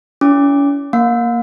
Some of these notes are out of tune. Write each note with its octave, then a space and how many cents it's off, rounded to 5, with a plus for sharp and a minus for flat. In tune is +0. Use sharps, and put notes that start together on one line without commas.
C#4 +40 E4 +10 D6 +0
A#3 +0 F5 +40